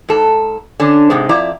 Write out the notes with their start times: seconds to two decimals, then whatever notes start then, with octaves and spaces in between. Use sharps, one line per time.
0.09 G#2 A4
0.80 D3 C#4 D4
1.10 G#2 C3 G#3
1.29 F2 E4 D5 A#5